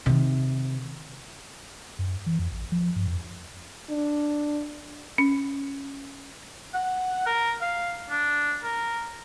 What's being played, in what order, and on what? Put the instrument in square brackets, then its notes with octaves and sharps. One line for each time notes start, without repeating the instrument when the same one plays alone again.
[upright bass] C3 D#3
[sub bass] F#2
E3
F2
A1
F3
G2
F2
[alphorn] D4
[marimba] C#4
[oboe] F#5
A#4
F5
D4
A#4